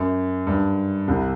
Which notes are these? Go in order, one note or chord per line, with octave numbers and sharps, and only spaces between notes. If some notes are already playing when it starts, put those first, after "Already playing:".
Already playing: F#2
G2
C2 C3